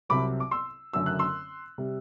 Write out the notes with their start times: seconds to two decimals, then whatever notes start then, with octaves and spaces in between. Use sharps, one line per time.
0.09 C2 C3 F#3 B5 D6
0.40 D6
0.51 C6 E6
0.93 F#1 F#2 D3 F#3 A3 E6
1.06 F#6
1.19 C6 E6
1.78 C3 G3